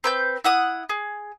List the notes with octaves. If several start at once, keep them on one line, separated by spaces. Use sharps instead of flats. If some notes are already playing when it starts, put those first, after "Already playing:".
C4 B4 G6
E4 F#5 D#6
G#4